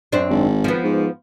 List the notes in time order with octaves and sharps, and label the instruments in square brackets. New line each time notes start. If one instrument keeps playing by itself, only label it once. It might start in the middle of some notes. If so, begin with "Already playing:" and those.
[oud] F#2 C4 D4
[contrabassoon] G#1
[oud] F3 B3
[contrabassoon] G#2